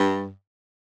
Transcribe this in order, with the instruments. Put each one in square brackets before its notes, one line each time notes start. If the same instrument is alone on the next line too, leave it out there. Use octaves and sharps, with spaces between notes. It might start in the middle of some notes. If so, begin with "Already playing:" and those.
Already playing: [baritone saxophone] G2